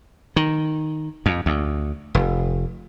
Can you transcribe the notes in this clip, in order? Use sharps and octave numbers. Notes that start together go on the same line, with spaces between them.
D#3
F2
D2
F1